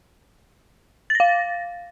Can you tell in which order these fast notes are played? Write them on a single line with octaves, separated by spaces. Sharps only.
A6 A#6 F5